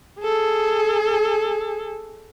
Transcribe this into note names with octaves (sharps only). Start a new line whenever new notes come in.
G#4 A4